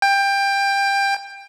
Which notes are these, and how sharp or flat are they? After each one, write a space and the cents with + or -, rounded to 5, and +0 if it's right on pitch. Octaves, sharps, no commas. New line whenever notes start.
G5 +20